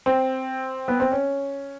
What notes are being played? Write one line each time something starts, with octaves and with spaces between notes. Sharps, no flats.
C4
B3
C4
C#4